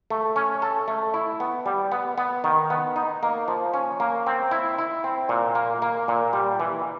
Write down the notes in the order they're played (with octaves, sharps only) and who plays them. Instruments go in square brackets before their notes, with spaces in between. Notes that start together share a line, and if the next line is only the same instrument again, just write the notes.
[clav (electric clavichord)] A3
C#4
A4
A3
E4
B3
G3
B3
B3
D#3
B3
D#4
A#3
F3
C#4
A#3
C4
E4
E4
C4
A#2
A#3
A#3
A#2
G3
E3